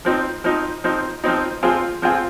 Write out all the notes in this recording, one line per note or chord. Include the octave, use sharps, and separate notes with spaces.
F3 C4 D#4
F3 C4 D#4
F3 C4 D#4
F3 C4 D#4
F3 C4 F4 G#4
F3 C4 F4 G#4